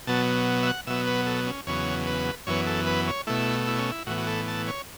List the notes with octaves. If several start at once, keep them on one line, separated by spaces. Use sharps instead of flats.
B2 F#3 B3 A5
E5
F#5
B2 F#3 B3 E5
B4
A4
C#4
E2 C#3 F#3 B3 C#5
B4
F#2 E3 B3 C#5
A4
B4
C#5
B2 A3 E4
E4
C#4
E4
A2 E3 B3 F#4
F#4
A4
A5
C#5